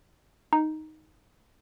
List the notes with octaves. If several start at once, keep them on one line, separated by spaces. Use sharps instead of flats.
D#4